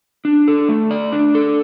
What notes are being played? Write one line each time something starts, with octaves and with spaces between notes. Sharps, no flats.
D4
A4
A3
D5
D4
A4